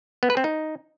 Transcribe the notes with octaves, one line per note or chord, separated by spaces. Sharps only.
B3
B4
C4
D#4